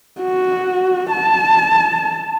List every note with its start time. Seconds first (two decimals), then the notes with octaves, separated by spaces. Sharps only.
0.21 F#4
1.11 A5